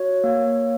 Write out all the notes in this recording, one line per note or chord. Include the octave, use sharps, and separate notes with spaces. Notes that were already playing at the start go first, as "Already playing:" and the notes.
Already playing: F#4 C#5
A#3